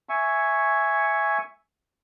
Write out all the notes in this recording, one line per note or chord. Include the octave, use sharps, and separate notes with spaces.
E5 G#5 C#6